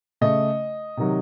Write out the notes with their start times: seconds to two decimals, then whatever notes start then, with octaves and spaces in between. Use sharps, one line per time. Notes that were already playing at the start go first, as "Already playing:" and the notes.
0.21 C#3 A3 D#5
0.97 C3 D#3 F#3